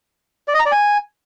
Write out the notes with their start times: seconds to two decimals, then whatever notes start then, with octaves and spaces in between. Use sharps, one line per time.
0.48 D5
0.54 D#5
0.60 A#5
0.66 D5
0.72 G#5